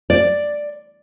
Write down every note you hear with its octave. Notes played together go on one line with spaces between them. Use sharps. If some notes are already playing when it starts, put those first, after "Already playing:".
D5